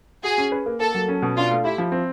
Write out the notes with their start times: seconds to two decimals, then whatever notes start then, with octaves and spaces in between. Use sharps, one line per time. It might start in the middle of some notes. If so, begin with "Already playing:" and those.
0.24 F#4 G#4
0.38 C#4
0.52 B4
0.66 A#3
0.80 A#3 A4
0.95 F#3
1.08 C#4
1.22 B2
1.36 D4 F4
1.51 A3
1.64 E4 G4
1.78 F3
1.92 C4